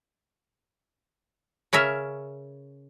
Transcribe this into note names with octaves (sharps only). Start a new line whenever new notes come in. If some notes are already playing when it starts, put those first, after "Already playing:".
C#3 C#4 A#4 E5